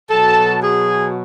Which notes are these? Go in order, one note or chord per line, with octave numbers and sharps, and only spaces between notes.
B2 F#3 A4 A5
G#4 G#5